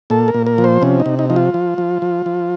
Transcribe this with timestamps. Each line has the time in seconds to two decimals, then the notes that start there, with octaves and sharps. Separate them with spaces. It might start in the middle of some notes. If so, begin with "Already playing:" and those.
0.10 A#2 A4
0.28 A#4
0.34 A#2
0.46 A#4
0.58 F3
0.64 C5
0.82 C3 C#4
1.00 D#4
1.06 C3
1.19 D#4
1.30 F3 D#4
1.36 F4
1.54 F3
1.78 F3
2.02 F3
2.26 F3